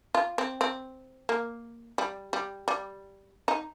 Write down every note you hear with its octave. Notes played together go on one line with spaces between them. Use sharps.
F4
C4
C4
A#3
G3
G3
G3
D#4